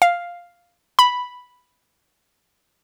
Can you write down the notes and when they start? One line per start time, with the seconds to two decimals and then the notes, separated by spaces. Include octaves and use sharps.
0.02 F5
0.99 B5